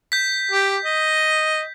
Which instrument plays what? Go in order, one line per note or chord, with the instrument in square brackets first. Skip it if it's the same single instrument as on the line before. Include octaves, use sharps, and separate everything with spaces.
[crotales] G6 B6
[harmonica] G4
D#5